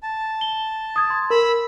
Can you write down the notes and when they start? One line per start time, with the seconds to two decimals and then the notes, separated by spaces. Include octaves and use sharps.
0.03 A5
0.41 G7
0.96 D#6 G#6
1.10 C6
1.30 A#4 B5 E6